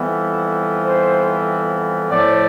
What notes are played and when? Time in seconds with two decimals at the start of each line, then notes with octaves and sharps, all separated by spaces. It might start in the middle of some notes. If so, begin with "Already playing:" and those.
Already playing: F2 E3 G3 B3 E4
0.84 C5
2.10 A2 F3 A3 D5